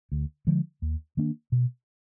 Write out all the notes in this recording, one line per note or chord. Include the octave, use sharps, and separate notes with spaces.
D2
D3 F3 G#3
D#2
D#3 A#3 D4
B2